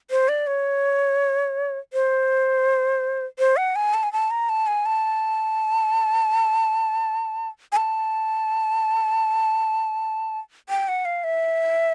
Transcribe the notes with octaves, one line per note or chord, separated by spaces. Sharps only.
C5
D5
C#5
C5
C5
F#5
G#5
A5
G#5
A5
A#5
A5
G#5
A5
G#5
A5
G5
F#5
F5
E5